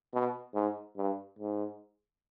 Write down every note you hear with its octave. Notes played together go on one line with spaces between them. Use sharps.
B2
G#2
G2
G#2